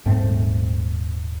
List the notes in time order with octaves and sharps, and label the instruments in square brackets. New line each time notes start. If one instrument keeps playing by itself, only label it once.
[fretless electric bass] D#1 G#2 A3 C4